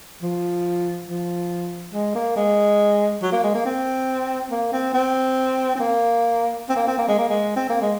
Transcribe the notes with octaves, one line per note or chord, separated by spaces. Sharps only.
F3
F3
G#3
A#3
G#3
F#3
A#3
G#3
A#3
C4
A#3
C4
C4
C4
A#3
C4
A#3
C4
A#3
G#3
A#3
G#3
C4
A#3
G#3